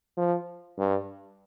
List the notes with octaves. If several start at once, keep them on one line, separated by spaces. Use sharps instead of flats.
F3
G2